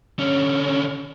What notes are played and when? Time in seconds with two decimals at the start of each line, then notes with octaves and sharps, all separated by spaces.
0.19 D3 C#4